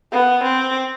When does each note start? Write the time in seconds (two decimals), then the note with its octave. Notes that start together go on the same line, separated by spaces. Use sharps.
0.12 B3
0.43 C4